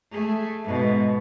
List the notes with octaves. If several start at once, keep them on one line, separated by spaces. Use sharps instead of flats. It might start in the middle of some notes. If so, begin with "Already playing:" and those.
A3 G#4
G#2 B2